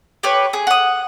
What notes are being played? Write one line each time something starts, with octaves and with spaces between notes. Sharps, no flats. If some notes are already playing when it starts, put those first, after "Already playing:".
G4 B4 C#5
G#4
F#5 D#6